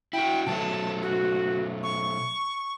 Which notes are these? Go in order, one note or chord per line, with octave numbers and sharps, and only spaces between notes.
E4 F#4 G5
B2 F#3 A3 A5
F#4
C#6